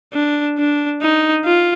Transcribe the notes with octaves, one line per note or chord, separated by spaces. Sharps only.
D4
D4
D#4
F4